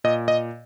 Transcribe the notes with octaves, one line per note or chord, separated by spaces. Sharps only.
A#2 D#5
D#5